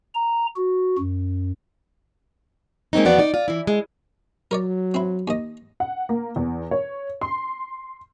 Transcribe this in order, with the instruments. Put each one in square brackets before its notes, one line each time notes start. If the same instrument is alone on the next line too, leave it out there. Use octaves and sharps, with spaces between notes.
[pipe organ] A#5
F#4
F#2
[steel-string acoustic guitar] G#3 A#3 C4 C#4 D#4
E2 F3 B3 F#4 D5 F#5
D#4 D5
F4
E3 E4
G#3
[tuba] F#3 [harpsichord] A#4 C#5 D5
[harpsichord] C4 E4
D#2 D#5
[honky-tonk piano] F#5
A#3
E2
C#5
C6